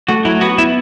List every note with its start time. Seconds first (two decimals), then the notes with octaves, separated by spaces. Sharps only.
0.09 A3 F#4
0.25 F#3 E4
0.41 B3 F#4
0.58 B3 E4